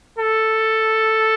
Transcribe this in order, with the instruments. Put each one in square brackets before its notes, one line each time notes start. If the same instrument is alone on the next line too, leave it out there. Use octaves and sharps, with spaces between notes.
[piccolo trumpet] A4